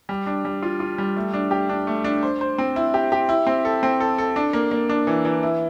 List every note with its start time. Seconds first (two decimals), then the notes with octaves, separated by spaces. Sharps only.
0.09 G3
0.27 D4
0.45 G3
0.62 F4
0.80 F4
0.98 G3
1.16 A3
1.34 D4
1.51 G4
1.69 D4
1.87 A3
2.04 D4
2.23 C5
2.41 C5
2.58 C4
2.76 E4
2.94 G4
3.12 G4
3.29 E4
3.47 C4
3.65 A4
3.83 C4
4.00 A4
4.18 A4
4.36 D4
4.53 A#3
4.71 A#3
4.89 D4
5.07 E3
5.25 E3
5.43 E4